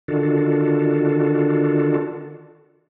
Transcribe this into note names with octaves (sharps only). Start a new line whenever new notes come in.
D3 D#3 D4 F4 F#4 A4